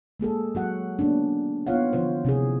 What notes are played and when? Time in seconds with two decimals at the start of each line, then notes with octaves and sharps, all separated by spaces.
0.20 G#3 A#3 G#4 A4
0.55 F#3 F#4 F#5
0.99 A#3 B3 C#4 D4
1.67 B3 D#4 F4 C#5 F5 F#5
1.93 D3 E3 F3 F4 C5
2.25 C3 C#4 E4 G#4